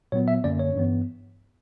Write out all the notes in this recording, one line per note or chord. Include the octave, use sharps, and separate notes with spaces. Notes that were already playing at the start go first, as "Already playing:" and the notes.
A#2 F#3 B3 C#5
E5
F#2 D3 A#3 C#4 D5
C#5
G2 E3 B3